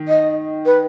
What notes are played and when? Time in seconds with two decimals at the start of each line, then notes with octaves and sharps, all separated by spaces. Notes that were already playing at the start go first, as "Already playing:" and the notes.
Already playing: D#3
0.08 D#5
0.66 B4